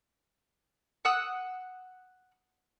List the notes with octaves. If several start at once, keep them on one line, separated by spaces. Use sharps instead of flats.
F#5 D#6 E6 F#6